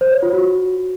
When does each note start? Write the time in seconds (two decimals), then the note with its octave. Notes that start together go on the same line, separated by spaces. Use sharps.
0.01 C5
0.12 C#5
0.23 F4
0.33 F#4